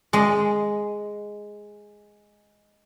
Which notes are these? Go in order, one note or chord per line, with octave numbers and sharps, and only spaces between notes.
G#3 D#5